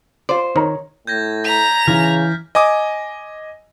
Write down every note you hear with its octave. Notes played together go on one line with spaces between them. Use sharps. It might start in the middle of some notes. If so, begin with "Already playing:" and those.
F4 C5 D5
D#3 C#5 A#5
A2 G6 G#6 A#6
A#5 A#6 B6 F7
C#3 E3 F6
D#5 G#5 D6 D#6